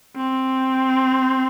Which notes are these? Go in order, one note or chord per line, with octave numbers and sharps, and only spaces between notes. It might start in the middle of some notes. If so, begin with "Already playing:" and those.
C4